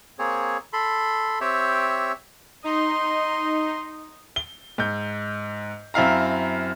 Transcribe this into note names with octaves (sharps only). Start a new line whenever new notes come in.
A#3 C4 G#4 C#5
A4 B5 C6
C4 G4 C#5 E5
D#4 D#5 C6
G7
G#2 G6
F#2 C4 E4 F5 A#5